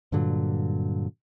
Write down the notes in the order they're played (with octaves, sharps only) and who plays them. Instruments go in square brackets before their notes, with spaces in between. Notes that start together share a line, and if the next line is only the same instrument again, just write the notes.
[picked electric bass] G2 A#2 D3 F#3